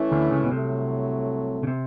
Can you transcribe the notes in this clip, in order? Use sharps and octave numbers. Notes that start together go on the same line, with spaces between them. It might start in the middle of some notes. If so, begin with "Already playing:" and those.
Already playing: E3 A3 C#4 E4
D2 D3
C#2 C#3
B2
C2 A2 C3 F#3 A3
C#3
C3